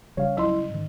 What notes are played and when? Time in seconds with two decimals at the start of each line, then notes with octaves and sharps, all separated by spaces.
0.17 C#3 G3 C#5 F5
0.37 C#2 F#3 E4 C6
0.70 G#2 D#3